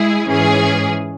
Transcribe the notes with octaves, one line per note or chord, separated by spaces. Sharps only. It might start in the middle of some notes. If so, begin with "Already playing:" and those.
Already playing: G#3 E4 G#4
G#2 E3 C#4 G#4